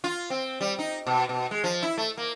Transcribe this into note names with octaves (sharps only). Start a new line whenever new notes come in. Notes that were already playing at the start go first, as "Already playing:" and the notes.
F4
C4
G3
D#4
B2
B2
G#3
F3
E4
A3
A#3